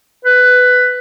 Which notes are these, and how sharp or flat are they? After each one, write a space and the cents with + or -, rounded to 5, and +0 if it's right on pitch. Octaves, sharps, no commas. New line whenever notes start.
B4 +10